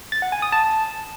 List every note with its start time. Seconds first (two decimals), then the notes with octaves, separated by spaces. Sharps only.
0.12 A6
0.22 F#5
0.32 G#5
0.42 D#6
0.52 A5